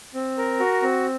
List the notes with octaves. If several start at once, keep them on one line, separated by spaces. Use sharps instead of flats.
C4
A#4
F#4
C4